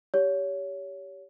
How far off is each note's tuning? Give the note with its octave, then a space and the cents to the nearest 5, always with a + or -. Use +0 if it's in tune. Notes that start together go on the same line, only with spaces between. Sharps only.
G4 +0 C#5 +25